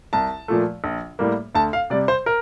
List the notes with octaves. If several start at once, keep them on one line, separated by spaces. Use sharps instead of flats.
C2 A5
A#2 F3 A3
A#1
A2 G3 A#3
D2 A5
F5
C3 G3 D5
C5
A#4